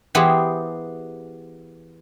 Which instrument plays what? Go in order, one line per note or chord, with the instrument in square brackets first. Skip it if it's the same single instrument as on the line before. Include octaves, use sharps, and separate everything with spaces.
[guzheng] E3 B3 G4 G#4 C5